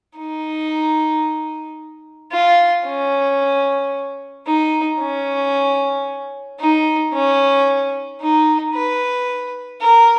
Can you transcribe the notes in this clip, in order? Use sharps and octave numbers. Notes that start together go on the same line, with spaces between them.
D#4
F4
C#4
D#4
C#4
D#4
C#4
D#4
B4
A#4